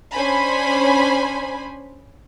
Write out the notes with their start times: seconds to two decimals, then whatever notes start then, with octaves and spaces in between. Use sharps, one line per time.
0.14 C#4 D4 C5 G#5 B5